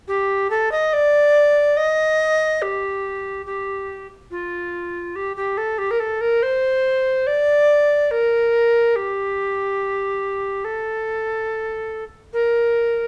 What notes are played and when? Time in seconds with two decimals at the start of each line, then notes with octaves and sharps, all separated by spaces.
0.08 G4
0.50 A4
0.72 D#5
0.93 D5
1.77 D#5
2.62 G4
3.46 G4
4.31 F4
5.16 G4
5.36 G4
5.57 A4
5.78 G4
5.91 A#4
6.00 A4
6.21 A#4
6.43 C5
7.27 D5
8.11 A#4
8.96 G4
10.64 A4
12.33 A#4